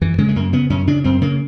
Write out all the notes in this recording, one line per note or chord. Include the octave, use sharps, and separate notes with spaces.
F#2 E3
C#3 G#3
A3
F#2 A#3
C#3 B3
F#2 C#4
C#3 D4
F#2 C4
C#3 A#3